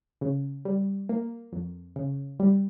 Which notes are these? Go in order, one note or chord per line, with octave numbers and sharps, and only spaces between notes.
C#3
G3
A#3
F2
C#3
G3